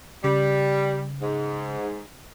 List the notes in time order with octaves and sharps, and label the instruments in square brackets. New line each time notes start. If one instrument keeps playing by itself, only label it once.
[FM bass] C#3 [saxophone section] G3
[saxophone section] G#2